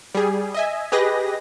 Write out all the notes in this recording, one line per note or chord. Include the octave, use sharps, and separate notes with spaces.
G3 G#4
D#5 E5 G#5
G4 G#4 B4 D#5 A#6